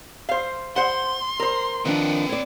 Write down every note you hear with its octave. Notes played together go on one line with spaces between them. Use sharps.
C5 F5
C5 F#5 C6
A#4 C5
D#3 F3 C4 D4 B4
C#5 D5